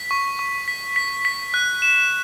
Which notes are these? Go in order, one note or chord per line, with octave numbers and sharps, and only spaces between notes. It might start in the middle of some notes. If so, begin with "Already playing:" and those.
Already playing: B6
C#6
C#6
B6
B6
B6
F#6
E7